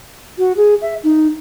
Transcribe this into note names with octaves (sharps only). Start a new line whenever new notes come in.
F#4
G#4
E5
D#4